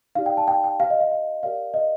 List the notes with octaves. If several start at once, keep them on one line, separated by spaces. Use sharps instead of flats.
D#4 G4 D5 F5
G5
A5
G5
G5
G4 C5 F5
D#5
F5
F5
G4 A#4 D5 F5
D#5